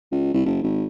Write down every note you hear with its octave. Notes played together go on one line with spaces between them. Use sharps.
C#2
C2
F#1
G#1